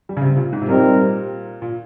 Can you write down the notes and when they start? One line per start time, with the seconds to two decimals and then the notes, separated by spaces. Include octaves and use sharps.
0.09 G3
0.17 C#3
0.22 C3
0.36 A#2
0.53 G#2
0.62 C3
0.68 A#2 G3 C4 D#4 A#4
1.62 A#2